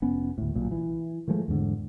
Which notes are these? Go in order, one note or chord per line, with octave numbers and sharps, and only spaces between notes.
F1 B3 C#4
D2 A2
B1 A#2
E3
D#3 F3 G#3 A3
E2 G#2 D3